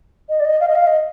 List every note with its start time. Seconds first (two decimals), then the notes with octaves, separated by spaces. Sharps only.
0.29 D#5
0.40 D5
0.45 D#5
0.60 F5
0.68 D#5
0.75 F5
0.87 D#5